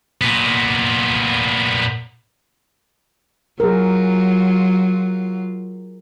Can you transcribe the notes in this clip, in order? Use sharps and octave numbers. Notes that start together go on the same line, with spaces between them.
A#2 B3
F#3 F4 G#4 A#4